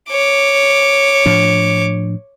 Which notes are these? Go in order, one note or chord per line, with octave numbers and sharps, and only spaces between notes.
C#5 D6
A2 F3 D4